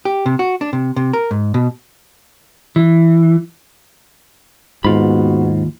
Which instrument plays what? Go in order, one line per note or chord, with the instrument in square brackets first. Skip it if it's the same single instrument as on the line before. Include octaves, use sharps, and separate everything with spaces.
[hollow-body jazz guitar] G4
C3
F#4
D4
C3
C3
A#4
G#2
B2
[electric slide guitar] E3
[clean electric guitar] D#2 F4 B5 [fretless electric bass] G#2 [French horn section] B3 F#4